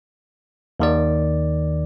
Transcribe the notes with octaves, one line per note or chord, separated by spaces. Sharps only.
D#2 D#3 D5